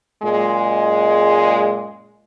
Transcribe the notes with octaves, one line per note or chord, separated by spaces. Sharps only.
F#2 A#2 G#3